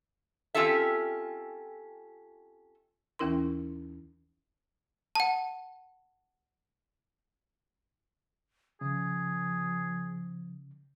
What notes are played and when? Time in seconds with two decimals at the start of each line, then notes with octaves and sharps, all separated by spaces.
0.54 C4 C#4 F4 G4 A4 E5
3.19 D#2 E3 C#4 E4 A#4 C6
5.15 F#5 A5
8.81 C#3 F3 G#4